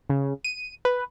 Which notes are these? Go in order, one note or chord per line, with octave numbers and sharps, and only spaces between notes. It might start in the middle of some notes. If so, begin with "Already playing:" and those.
C#3
D#7
B4